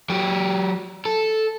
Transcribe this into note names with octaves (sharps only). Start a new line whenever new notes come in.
F#3 G4
A4